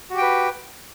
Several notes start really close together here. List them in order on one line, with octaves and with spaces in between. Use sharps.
F#4 G4 G5 B4